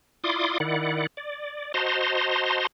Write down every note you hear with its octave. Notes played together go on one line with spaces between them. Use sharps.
E4 F4 D5 C6 D6 D#6
D#3 E4 D5 F#5
D5
F#4 C5 D#5 A5 A#5 C6